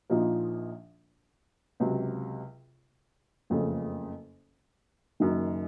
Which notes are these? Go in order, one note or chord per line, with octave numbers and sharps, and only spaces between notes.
A#1 A#2 F3 A#3 D#4
C#2 C3 F#3
F#1 F2 C#3 A3
F#1 F#2 D#3